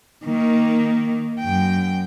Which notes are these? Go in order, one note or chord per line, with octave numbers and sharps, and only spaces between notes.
D#3 A#3
F#2 G5